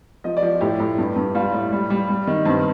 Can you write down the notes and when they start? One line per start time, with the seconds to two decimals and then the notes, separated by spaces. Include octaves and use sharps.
0.24 F3 D#5
0.37 D5
0.43 F3
0.61 A2 G4
0.80 A2
0.98 G2
1.16 G2
1.35 G3 F4
1.54 A2
1.72 G3
1.90 G3
2.09 G3
2.27 D#3
2.45 G2 C4